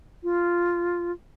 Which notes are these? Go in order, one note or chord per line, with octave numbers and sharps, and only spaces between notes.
F4